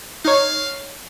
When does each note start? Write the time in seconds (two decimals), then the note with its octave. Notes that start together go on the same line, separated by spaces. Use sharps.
0.25 D#4 C#5 F5